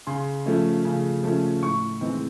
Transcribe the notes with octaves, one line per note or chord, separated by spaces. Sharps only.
C#3 C6
F3 A3 C#4
C#3
F3 A3 C#4
A2 C#6
E3 G#3 C4 D#4